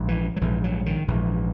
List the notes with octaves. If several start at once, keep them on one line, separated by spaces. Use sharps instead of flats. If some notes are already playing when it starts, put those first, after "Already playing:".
Already playing: A#1 G#2
E3
F#3
A#1 G#2 E3
F#3
D#3
A#1 G#2 E3